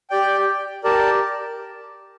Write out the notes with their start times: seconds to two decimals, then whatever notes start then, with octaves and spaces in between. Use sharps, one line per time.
0.10 G4 D5 G5
0.84 G4 A#4 D5 A5